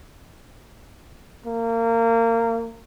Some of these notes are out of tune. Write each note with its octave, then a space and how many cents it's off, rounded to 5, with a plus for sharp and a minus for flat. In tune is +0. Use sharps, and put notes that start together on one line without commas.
A#3 -25